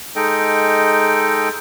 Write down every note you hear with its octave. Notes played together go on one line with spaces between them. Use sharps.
G#3 D#4 A4 D#5 G5